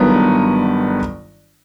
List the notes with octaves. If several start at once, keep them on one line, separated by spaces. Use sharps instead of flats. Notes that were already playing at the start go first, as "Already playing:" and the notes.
Already playing: G1 G2 D#3 F#3 B3 A#5